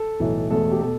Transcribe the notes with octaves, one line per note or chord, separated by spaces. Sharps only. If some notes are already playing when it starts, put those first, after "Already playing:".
Already playing: A4
B1 A2 E3
E1 E2 B2 A3 A4
G4
B2 A4